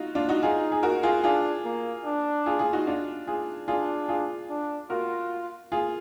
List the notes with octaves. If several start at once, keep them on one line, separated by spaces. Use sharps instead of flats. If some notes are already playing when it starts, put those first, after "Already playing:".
Already playing: D#4 F4 F#4
D4 F4
D#4 F#4
D#4 F4 G#4
G#4
F#4 A#4
F4 G#4
D4 F4 G#4
A#3
D4
F4 G#4
F4 G#4
D#4 F#4
D4 F4
F4 G#4
D4 F4 G#4
F4 G#4
D4
F4 F#4 A#4
F4 G#4